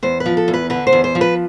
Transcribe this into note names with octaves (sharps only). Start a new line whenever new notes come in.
E2 C5
B4
F3
A4
E2
B4
D3 B4
C5
E2
C5
F3
B4